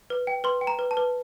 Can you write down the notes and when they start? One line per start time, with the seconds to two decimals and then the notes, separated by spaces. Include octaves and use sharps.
0.10 B4
0.27 G5
0.44 B4 C6
0.61 G5
0.67 A#5
0.79 B4
0.91 A5
0.97 B4